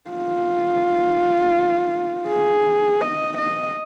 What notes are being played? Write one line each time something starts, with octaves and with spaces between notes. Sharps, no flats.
F4
G#4
D#5
D#5